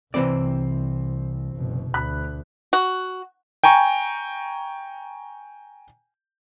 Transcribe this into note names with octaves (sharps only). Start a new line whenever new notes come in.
C2 C3 E3 C4 C5 D5
F#1 B2
D2 B5 F#6
F#4
G5 G#5 A#5 C#6